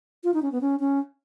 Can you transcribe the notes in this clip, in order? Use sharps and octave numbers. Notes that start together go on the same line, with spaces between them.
F4
D#4
C#4
B3
C#4
C#4